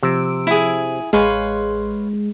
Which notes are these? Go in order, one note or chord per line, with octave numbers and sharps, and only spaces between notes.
C3 F3 E6 D7
E4 G#4
A1 G#3 B4 C#5 F5 G#5 C6